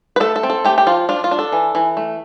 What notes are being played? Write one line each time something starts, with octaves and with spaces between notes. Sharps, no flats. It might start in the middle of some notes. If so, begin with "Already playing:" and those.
B4
A3 A4
A4
C4
A4
A3 G4
G4
F3 F4
D4 F4
F4
D4
A4
E3
E3
A3